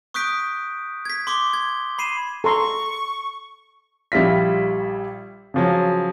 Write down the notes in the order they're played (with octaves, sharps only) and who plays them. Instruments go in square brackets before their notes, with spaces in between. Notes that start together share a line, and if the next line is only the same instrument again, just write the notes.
[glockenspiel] C#6 D#6 F#6 G6 B6 D7
G#6 B6
C6 D6 G7
G#6
B5 C7 D#7 E7
[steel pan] A4 A#5 C6 [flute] C#6
[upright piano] A#1 G3 E4 F4 B6
C#3 F3 F#3